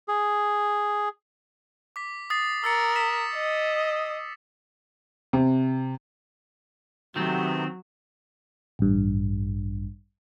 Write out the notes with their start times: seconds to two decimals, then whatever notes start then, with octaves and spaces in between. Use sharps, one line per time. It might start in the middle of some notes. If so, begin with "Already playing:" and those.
0.08 G#4
1.96 D6 B6
2.30 D#6 A6 C7
2.64 A#4 E6 A6 C#7
2.96 B6 E7
3.35 D#5
5.33 C3
7.16 C3 D#3 F#3 A3 B3 C4
8.79 A1 G2